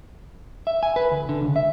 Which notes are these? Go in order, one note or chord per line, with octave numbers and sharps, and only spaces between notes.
E5
G#5
B4
D2
D3
C#2
E5